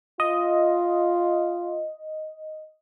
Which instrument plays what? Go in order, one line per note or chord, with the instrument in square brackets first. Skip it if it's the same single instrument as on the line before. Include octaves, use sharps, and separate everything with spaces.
[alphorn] F4 [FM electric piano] D#5